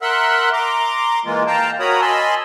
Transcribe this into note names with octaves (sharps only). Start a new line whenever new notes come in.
A#4 E5 F#5 C6 E6 F#6
A#5 C6 D6
E3 G#3 A#3 F4
F5 G5 A5 A#5
F#4 A#4 C#5 A#5 B5 D#6
D#5 G#5 A5 B5 C6 E6